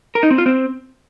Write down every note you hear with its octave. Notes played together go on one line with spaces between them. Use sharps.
A#4
D#4
C4
F4
C4